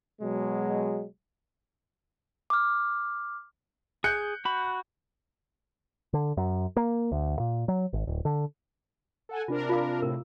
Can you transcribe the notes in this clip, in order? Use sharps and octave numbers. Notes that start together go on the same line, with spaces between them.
B2 F#3 G#3
D6 F6
G#4 F#6 G6 C#7
F#4 B5
D3
F#2
A#3
D2
A#2
F#3
G#1
D1
D3
A4 F#5 G#5
C3 D4 F4 A#4
F4 F5 D6
A2 C3 A#4